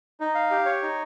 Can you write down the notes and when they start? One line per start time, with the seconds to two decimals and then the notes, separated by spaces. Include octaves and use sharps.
0.20 D#4
0.35 F5
0.51 G4
0.66 C#5
0.82 D#4